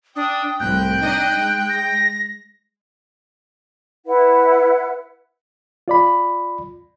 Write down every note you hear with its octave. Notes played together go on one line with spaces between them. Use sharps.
D4 G5 D#6
C2 A2 G5 F#6
D4 D#4 D#5
G#3
A#6
E4 B4 F#5
F4 D5 B5